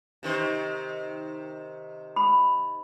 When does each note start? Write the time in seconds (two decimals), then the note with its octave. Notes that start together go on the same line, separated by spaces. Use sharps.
0.23 C3 D#3 C5
2.16 B5